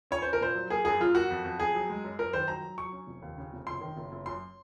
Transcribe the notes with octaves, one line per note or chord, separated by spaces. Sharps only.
C#4 C#5
C#4 C5
A#4
A#2 C5
F#3
A#3 G#4
F#2 G#4
F#2 F4
A#3 F#4
F2
F2
F2 G#4
F#3
G#3
F#2
F#2 A#4
D#3 C5
F#3 A#5
F#3
F#3 C#6
C#4
F1
D#2
C#3
F1
F#1 C6
D#3
F#1
F#1
F#2 C6